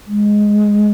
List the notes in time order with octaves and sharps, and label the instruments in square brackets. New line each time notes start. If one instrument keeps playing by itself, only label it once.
[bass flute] G#3